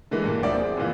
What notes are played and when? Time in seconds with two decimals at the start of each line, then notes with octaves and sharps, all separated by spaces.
0.11 D3 E3 G#3 A3
0.24 G2 A#2 E3
0.42 D2 F3 G4 D5 E5 D6
0.55 C4 G#4
0.77 F#1 A#2 E3 F4